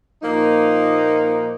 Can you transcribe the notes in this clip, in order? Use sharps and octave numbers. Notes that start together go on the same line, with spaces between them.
A#2 F3 A#3 D#4